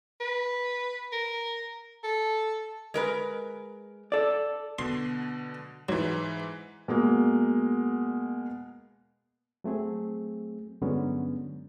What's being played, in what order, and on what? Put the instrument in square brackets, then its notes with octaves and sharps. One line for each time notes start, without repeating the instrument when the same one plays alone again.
[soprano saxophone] B4
A#4
A4
[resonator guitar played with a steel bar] G#3 A#4 B4
[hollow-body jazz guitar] A4 D5
[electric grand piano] B2 D3 [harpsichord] C6
[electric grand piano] G#2 E3 [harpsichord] F#3
[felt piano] B2 G#3 A#3
[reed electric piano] F#3 A3 C4 G#4
G2 D3 F#3 G#3 B3 C#4